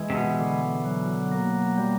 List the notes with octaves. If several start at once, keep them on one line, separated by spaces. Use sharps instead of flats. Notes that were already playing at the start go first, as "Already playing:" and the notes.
Already playing: E3 G#3
C3
B2
D3
F#3
A#3
G3